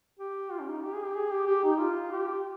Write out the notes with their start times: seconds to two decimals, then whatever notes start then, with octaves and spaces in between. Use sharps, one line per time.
0.20 G4
0.52 F4
0.61 C#4
0.68 D#4
0.84 G4
0.94 G#4
1.05 G4
1.15 G#4
1.31 G4
1.47 G4
1.64 D#4
1.80 F4
2.12 G4